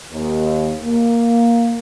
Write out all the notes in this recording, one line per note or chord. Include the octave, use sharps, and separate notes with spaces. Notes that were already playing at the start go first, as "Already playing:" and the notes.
D#2
A#3